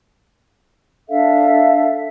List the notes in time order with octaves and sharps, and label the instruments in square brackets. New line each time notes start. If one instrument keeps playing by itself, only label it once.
[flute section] D4 A4 E5 F5